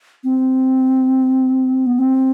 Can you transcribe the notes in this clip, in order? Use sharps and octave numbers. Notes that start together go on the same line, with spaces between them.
C4
B3
C4